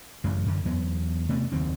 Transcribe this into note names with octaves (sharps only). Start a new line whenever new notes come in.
A1 F#2 C#3
F#2 D3
E2 F#3 B3
C3 A3 B3
F#1 D#2 C4